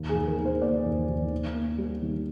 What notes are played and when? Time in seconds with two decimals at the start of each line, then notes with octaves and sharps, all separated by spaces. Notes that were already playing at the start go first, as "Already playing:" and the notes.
Already playing: D#2
0.09 G#4
0.15 D#2
0.28 A#4
0.38 D#3
0.45 C5
0.62 A#3 D5
0.86 D#2
1.09 D#2
1.32 D#3
1.55 A#3
1.78 G3
2.02 D#3